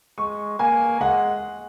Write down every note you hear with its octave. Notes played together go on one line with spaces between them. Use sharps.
G#3 C#6
A#3 G#5
G#3 F#5